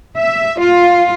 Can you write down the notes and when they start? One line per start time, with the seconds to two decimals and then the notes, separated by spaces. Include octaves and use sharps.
0.16 E5
0.59 F4